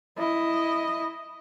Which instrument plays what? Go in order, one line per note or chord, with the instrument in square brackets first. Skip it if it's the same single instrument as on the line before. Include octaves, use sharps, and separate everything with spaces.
[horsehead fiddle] E4 D#5